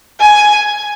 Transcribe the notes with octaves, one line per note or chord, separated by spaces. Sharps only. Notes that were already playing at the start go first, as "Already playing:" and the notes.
G#5